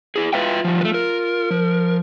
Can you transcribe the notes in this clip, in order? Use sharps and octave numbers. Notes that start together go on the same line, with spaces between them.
E4 G#4
F4 B4 E5 G5
F3 G3
A3 B4
A#4
F3